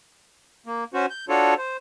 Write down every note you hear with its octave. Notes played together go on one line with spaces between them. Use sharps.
A#3
C#4 F#4 C5
G6
D4 F4 F#4 A4 C#5
C5